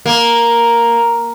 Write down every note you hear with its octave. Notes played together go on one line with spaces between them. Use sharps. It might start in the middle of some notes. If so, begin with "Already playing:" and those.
A#3